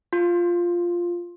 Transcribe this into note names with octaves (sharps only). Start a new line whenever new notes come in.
F4